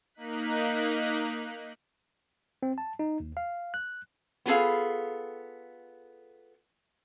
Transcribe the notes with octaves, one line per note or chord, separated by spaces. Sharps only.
A#3 D#4 F#6 B6
C4
A5
D#4
D#2
F5
F#6
B3 F4 G#4 A4 F5